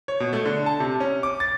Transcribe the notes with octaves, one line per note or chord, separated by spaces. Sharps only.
C#5
B2
A3
D3
A5
C3
C#4
D6
A6